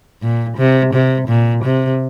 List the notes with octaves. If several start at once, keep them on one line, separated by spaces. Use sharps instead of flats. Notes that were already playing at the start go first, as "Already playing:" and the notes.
A#2
C3
C3
A#2
C3